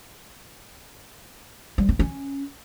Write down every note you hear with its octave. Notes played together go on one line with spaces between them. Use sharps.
G3
C4
C#4